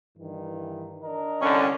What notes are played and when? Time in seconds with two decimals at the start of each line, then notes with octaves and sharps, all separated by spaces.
0.18 G2 D#3 E3
1.03 D4 A#4 D#5
1.41 C2 D3 C#4